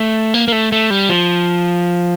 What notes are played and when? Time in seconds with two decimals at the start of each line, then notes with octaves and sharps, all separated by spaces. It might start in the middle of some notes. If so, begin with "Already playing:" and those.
Already playing: A3
0.34 A#3
0.48 A#3
0.52 A3
0.72 A3
0.90 G3
1.09 F3